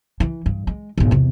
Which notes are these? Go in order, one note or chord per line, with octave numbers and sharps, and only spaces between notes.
E3
G2
G#3
B1 G#2
E2 C3